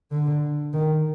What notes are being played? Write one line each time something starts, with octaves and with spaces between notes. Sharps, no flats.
D3
D#3